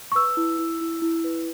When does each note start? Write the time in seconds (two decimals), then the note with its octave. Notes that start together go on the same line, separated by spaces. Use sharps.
0.12 C#6
0.15 B4 E6
0.37 E4
0.59 E4
0.81 E4
1.02 E4
1.24 B4